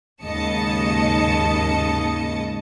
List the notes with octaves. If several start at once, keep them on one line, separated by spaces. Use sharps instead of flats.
D#2 G#2 C#3 D#5 A5 C#7